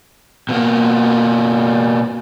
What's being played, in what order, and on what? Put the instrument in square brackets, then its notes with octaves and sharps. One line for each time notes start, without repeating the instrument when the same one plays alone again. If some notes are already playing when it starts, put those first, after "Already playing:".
[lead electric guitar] B2 A#3